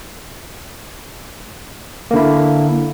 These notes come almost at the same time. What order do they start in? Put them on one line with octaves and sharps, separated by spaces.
A#3 D3 E4